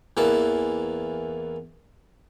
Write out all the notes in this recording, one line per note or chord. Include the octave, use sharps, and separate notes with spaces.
E2 E3 A#3 A5